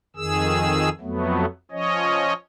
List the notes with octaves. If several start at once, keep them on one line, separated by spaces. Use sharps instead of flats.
F2 D#3 G#4 E6
F2 F#3 A3 B3
F3 C#4 C#5 D#5